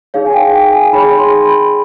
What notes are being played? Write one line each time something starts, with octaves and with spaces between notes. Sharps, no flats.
D#4 G#4 C#5 F5
G#5
G5
G5
G#5
D#4 G#4 C#5 B5
C6
B5